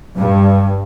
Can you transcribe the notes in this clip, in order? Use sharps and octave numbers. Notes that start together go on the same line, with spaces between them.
G2